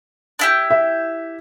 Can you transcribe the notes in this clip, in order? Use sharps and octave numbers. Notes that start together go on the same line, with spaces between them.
D4 E4 G4
E5